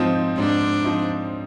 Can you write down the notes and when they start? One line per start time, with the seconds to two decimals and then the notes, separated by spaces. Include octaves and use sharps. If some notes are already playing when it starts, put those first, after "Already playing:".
Already playing: G#2 F3 C4 D#4
0.38 G#2 D4
0.84 F3 C4 D#4